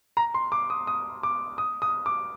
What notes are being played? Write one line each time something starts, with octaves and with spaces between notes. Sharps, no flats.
A#5
C6
D6
D#6
D#6
D6
D#6
D#6
D6